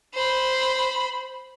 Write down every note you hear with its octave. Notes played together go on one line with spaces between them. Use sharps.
C5 B5